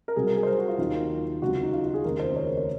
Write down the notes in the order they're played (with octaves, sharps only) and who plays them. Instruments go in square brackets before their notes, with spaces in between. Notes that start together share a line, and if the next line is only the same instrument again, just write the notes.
[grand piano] A#4
C2 C3 F#3 G#4
A#4
G#4
C5
A#4
F#4
F4
D#2 D#3 F#3 F4
C#2 C3 F#3 F#4
D#4
F4
F4
G#4
F1 D#2 C#3 A#4
C5
C#5
A#4
C5
C#5